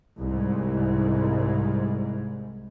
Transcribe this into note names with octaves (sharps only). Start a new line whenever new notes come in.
C2 G#2